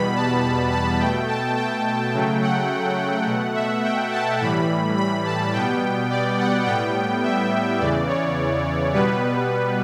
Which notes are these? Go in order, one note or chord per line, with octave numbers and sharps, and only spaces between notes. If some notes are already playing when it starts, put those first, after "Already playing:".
Already playing: E2 B2 G3 B3 B5
A5
A5
A5
B2 A3 G5
A5
G5
C#3 F#3 A3
F#5
B2 A3
E5
G5
A5
A2 E3 G3 B5
B5
A5
B2 G3 B3 G5
D5
F#5
A2 G3 B3 G5
E5
E2 C#3 E3 D5
C#5
B2 G3 B3 B4